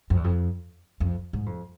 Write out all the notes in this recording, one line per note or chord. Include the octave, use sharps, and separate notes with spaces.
F2
E2
F2
F2
G#2
F2